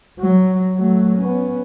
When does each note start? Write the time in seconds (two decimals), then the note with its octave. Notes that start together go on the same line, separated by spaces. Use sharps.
0.20 F#3
0.76 F#3 A3
1.18 B3 C#4